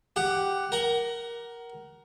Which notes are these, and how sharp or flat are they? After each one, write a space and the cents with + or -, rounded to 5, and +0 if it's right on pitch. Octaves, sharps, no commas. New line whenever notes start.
G4 +0 F#5 +10
A#4 +10 F#5 +30